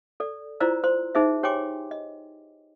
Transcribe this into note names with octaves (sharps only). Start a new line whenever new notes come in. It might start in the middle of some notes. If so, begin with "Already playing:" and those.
A4 D5
E4 F4 C5 D5 A#5 E6
C5 C6
D#4 G#4 C5 E5
G4 C#5 G5 G#5 C6 D6
D#5